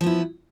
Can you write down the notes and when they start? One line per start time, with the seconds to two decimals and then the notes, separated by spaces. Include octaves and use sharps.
0.01 F3
0.04 B3
0.06 E4